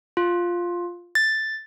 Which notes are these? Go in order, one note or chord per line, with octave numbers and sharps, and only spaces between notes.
F4
A6